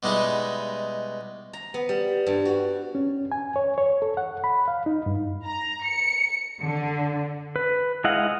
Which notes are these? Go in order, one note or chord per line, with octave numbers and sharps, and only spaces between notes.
B2 G3 G#3 D#4 E4
A#5
B3
G3
G2
F#4
C#4
G#5
C#5
C#5
A4
F#5
B5
F5
D#4
G2
A#5
C#7
D3
B4
G#3 E4 D#5 F5 F#5